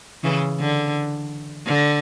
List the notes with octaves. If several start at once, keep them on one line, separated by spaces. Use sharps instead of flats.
C#3 E3
D3
D3